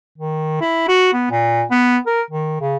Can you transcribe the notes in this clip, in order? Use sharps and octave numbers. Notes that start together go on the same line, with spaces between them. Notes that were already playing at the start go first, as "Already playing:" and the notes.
D#3
E4
F#4
B3
A#2
B3
A#4
D#3
C#3